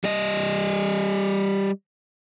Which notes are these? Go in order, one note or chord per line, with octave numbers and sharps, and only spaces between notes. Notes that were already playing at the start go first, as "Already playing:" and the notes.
G3 D#5